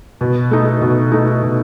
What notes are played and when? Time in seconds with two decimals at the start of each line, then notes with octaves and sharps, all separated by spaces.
0.21 B2
0.51 A3 D#4
0.81 B2
1.12 A3 D#4
1.43 B2